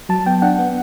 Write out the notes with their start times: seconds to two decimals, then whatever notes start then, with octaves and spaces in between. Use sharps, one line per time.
0.09 F#3 A5
0.26 B3 G5
0.42 D4 F#5
0.59 B3